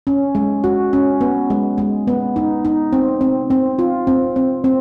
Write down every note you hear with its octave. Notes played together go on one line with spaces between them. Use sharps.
C#4
G#3
F#4
C#4
B3
G#3
G#3
B3
D#4
D#4
C4
C4
C4
F4
C4
C4
C4